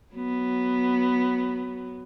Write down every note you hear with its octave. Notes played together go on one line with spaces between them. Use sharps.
F#3 B3